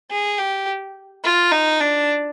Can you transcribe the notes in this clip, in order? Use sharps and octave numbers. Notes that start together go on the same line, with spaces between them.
G#4
G4
F4
D#4
D4